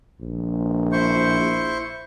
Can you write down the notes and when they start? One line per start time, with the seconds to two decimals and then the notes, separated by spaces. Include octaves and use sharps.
0.20 A#1
0.92 E4 C5 C#6